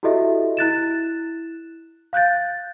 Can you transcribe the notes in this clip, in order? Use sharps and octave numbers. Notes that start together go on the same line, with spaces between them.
E4 F#4 G4 A4 D#5 E5
E4 F#6 A6 E7
F5 F#6 G6 A6